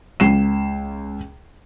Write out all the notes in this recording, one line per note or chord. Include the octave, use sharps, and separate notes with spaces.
C#2 C7 E7